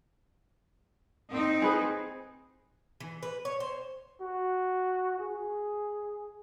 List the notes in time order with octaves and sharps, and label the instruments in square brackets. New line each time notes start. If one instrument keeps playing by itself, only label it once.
[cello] C4 D#4
[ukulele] G#4 B4 C5
[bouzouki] E3
B4
C#5
C5
[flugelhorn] F#4
G#4